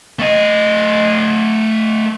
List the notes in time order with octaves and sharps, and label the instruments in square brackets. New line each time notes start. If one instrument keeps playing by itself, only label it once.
[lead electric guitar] A3 D#5